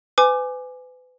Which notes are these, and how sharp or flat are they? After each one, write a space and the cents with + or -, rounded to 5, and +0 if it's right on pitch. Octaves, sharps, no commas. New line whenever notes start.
B4 +35 G#5 +0 D6 +20